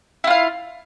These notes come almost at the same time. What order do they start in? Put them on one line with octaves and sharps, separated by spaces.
E4 F4 F5